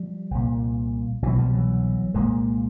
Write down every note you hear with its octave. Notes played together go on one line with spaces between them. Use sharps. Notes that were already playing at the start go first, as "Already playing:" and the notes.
Already playing: F3 G3
C2 A#2
C2 B2 E3 F#3
F3 G3
E3 F#3
C2 A#2 G#3 A#3